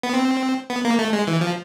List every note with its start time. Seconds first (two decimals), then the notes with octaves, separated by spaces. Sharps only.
0.03 B3
0.13 C4
0.70 B3
0.85 A#3
0.99 A3
1.13 G#3
1.27 E3
1.41 F3